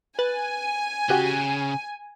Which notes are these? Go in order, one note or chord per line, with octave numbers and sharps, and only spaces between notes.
B4 G#5 F#6 A6
C#3 F#4 G4 F#6